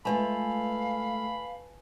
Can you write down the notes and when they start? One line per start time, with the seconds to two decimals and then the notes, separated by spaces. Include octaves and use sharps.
0.05 G#3 A3 F4 B4 F5 G#5 A5 B5